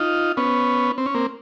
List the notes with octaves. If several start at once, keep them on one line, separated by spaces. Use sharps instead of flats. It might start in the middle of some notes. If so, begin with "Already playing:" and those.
Already playing: D#4 F4
B3 C#4
C4
C#4
A#3 C4